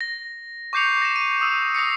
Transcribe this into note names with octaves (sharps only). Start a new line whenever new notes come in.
A#6
C#6 D6 G6 C7 C#7 F7
A#6 E7
D#7
D#6 E6
D#6 A#6 C7 C#7